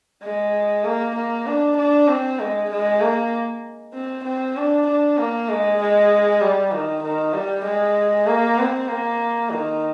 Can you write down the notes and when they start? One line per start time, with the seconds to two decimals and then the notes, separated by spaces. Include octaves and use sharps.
0.23 G#3
0.84 A#3
1.15 A#3
1.46 D4
1.77 D4
2.08 C4
2.40 G#3
2.70 G#3
3.01 A#3
3.94 C4
4.25 C4
4.56 D4
4.87 D4
5.18 A#3
5.49 G#3
5.80 G#3
6.41 G3
6.72 D#3
7.03 D#3
7.34 G3
7.65 G#3
8.27 A#3
8.58 C4
8.88 A#3
9.51 D#3